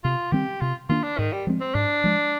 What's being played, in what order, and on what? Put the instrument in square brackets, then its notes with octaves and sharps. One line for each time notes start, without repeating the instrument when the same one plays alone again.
[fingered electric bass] C3 [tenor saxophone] F4
[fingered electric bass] D#3 G3 C4 [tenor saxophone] G4
[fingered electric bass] C3 [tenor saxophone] F4
[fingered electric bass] D#3 A#3 D4 [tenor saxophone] F4
[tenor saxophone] D4
[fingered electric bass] G#2 [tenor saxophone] D#3
[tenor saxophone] G3
[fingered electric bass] F3 G#3 C4
[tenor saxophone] C4
[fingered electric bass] G#2 [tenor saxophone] D4
[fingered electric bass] F3 G#3